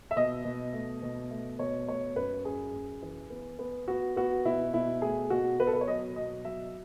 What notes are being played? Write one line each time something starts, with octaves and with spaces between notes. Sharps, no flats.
E5
B2 D#5
B2
A3
B2
A3
B2 C#5
A3 C#5
F#2 B4
F#2 G#4
F#2
E3
B3
B3
B3 F#4
B3 F#4
B2 E4
B2 E4
A3 G#4
B2 F#4
B2 B4
A4
B4
C#5
F#3 D#5
B2 D#5
F#3 E5